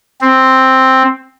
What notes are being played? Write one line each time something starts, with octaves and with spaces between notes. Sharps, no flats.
C4